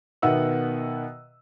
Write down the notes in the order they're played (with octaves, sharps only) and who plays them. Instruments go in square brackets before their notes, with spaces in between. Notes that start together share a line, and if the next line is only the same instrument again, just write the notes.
[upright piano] B2 D#3 B3 E5 F#5 E6